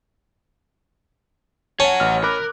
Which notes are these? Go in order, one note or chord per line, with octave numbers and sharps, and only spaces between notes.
C#4 C#5 F#5 A5
A1 F6
A#4 B5 D6 F#6